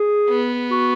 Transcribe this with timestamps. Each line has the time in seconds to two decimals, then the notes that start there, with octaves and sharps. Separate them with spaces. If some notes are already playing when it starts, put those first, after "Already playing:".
Already playing: G#4
0.29 B3
0.71 F#4